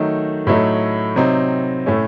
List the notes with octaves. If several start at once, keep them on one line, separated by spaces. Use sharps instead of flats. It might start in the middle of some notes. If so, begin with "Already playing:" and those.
Already playing: D#3 F#3 A3 D#4
A2 F#3 A3 D#4
C3 F#3 C4 D#4
A2 A3 C#4